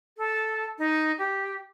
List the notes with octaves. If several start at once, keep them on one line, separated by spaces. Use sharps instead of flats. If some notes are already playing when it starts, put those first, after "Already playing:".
A4
D#4
G4